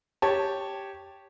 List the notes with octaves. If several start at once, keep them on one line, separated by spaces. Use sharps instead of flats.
G4 C#5 A5